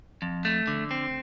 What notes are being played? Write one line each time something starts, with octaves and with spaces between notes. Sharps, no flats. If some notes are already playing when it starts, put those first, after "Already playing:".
F2
A3
D3
C4